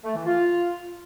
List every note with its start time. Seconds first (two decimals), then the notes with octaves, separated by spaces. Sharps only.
0.04 A3
0.15 E3
0.27 F4